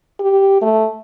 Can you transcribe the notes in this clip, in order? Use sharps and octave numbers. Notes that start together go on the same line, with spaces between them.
G4
A3